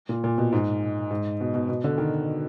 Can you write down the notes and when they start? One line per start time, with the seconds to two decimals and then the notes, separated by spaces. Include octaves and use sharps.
0.09 A#2
0.24 A#2
0.38 B2
0.52 G#2
1.11 G#2
1.40 B2
1.54 B2
1.69 B2
1.84 D3
1.98 D#3